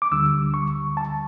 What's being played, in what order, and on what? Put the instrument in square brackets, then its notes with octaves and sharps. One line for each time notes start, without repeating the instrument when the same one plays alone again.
[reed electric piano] D6
D2 D3 G3 E6
C#6
A5